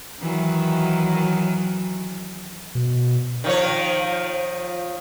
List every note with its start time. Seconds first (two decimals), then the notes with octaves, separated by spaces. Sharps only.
0.20 D#3 E3 F#3
2.75 B2
3.44 D#3 F3 C#5